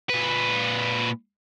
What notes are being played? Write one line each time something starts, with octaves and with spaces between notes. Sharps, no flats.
A#2 B4